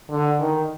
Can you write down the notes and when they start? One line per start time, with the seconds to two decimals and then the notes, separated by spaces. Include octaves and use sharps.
0.10 D3
0.40 D#3